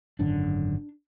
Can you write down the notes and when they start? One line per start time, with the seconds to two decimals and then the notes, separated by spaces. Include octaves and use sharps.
0.19 G#1 F#2 D3 D4